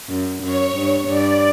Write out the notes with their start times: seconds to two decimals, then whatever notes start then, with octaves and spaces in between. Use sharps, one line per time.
0.10 F#2
0.43 F#2 C#5
0.76 G2
1.07 G2 D5